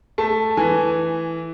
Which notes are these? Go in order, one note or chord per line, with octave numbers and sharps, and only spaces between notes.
A3 A5
E3 G#5